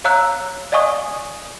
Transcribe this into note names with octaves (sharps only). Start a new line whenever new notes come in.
C#5 F5 A#5 E6 F#6
D5 D#5 F5 G#5 C#6 D#6